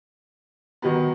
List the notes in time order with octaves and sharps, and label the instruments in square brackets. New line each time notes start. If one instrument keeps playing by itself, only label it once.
[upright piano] D#3 F#3 B3